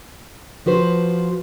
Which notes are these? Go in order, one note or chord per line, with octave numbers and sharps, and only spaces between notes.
F3 F#4 B4 C5